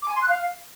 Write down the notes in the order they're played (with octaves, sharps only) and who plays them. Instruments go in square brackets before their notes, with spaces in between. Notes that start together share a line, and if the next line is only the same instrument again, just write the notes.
[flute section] D6
G#5
C6
F#6
F5